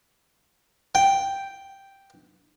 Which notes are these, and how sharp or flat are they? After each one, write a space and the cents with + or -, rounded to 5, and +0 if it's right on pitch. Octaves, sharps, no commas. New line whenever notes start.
G5 +0